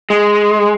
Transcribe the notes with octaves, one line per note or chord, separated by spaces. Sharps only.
G#3